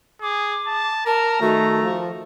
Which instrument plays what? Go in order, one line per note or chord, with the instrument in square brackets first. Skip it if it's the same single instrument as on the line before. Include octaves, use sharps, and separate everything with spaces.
[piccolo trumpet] G#4 [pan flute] D6
[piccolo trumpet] A5
[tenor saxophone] A#4 [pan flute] A5 [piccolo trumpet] A#5
[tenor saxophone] D#3 [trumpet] A3 [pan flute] F#4
[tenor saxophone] F3